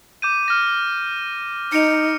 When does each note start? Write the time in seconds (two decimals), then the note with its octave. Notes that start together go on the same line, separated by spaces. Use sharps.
0.22 D6 G6 D#7
0.48 F6 A#6
1.72 D#4 C#7 D7 F7